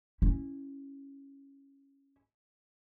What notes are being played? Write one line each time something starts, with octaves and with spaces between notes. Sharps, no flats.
C#4 E4